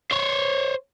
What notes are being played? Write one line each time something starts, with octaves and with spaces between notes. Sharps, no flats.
C5 C#5